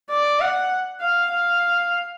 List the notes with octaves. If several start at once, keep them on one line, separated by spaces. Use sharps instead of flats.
D5
F#5
F5
F5